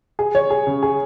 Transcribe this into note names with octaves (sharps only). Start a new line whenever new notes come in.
G#4
C#5
G#4
C#3
G#4